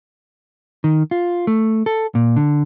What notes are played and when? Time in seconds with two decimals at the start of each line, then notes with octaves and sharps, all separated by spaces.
0.84 D#3
1.11 F4
1.47 A3
1.86 A4
2.15 A#2
2.36 D3